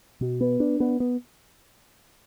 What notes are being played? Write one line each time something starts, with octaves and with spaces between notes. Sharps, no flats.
B2
B3
D4
B3
B3